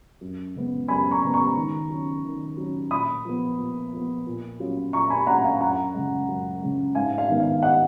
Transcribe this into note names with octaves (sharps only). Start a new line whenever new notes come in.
F#2
C#3 G#3 B3
F#2 G#5 B5
A#5 C#6
C#3 G#3 B3
A#5 C#6
D#3
F#3 C#4
D#3
F#3 C#4
A#2 B5 D#6
F3 B3
A#2
F3 B3
A#2
F#3 C#4 F4
A#2 A#5 C#6
G#5 B5
F#3 C#4 F4 F#5 A#5
F5 G#5
F#2 F#5 A#5
C#3 G#3
F#2
C#3 G#3
G#2 F5 G#5
F5
D#3 G#3 B3
F5
D#5 F#5